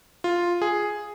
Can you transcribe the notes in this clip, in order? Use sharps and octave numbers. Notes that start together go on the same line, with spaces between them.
F4
G#4